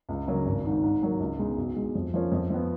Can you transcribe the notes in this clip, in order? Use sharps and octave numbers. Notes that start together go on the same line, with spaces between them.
C#2
C#3 F#3 A#3
G#1
G#2 D#3
G#2
D#3 F#3 A#3
C#2
B2 G#3 D#4
B1
B2 G#3
F2
F3 A#3 C#4
F2
F3 B3